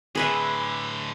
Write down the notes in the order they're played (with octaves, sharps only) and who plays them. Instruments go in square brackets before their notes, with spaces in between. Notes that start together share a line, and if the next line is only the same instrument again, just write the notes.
[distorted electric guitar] A2 D3 [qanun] G#4 B4 E5